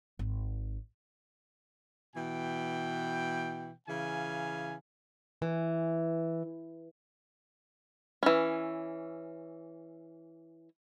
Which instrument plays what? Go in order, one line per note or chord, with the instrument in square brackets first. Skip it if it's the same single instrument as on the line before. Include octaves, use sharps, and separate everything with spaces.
[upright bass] G#1
[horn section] B2 E3 G5
C#3 E3 F5 G#5
[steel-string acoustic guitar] E3
[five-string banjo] E3 C#4